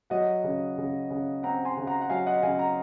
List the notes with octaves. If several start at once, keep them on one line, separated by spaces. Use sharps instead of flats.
F#3 D#5 F#5
C#3
C#3
C#3
C4 F#5 A#5
G#5 C6
C#3
F#5 A#5
F#5
F#3 F5 G#5
D#5 F#5
C#3 F5 G#5
F#5 A#5